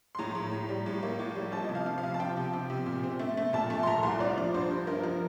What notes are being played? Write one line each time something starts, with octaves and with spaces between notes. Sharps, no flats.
C6
A2 A#5
A2
A2
G3
A2
A#3
A2
G3
F3 A5
C3 D#5
F5
F3
F5
C3
A5
F3 G5
C3
F3
C3
A#2
C4
A3
A3
A#2 A5
A3
C6
A#2 A#5
C2
F3 D5
F3
G2 C5
G2
F3 A#4
F3